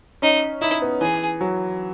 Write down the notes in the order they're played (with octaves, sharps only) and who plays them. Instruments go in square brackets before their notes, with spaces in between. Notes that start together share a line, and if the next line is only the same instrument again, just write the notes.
[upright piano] C#4 [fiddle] D#4
[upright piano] D#4 [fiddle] E4
[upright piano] B3
[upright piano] E3 [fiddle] G#4
[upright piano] F#3